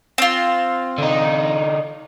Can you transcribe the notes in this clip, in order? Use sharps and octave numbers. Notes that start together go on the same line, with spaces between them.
C4 F4
D3 D#4